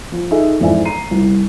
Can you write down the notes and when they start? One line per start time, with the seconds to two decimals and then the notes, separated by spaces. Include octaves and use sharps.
0.12 F3
0.31 D#4 G#4 A4 E5
0.60 F2 G#2 E3 D5 E5 G#5
0.85 A#5 C7 D#7
1.11 C2